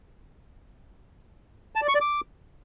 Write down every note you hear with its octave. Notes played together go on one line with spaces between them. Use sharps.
A5
D5
C#6
D5
D6